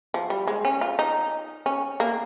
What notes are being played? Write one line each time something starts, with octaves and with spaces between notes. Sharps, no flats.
F3
G3
G#3
C#4
F4
D#4
C#4
A#3